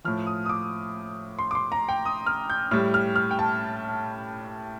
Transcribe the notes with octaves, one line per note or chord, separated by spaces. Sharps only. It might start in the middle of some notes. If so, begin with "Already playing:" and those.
A2 F3 F6
D#6
D#6
D6
C6
D6
C6
A#5
G5
D#6
F6
G6
A2 G3 F6
F6
F6
G5
A5